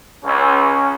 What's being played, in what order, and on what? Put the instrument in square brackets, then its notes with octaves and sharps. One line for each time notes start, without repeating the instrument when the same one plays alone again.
[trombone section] C#2 [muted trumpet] C#4